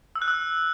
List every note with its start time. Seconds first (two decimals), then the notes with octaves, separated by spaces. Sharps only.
0.16 E6
0.22 F#6
0.28 E6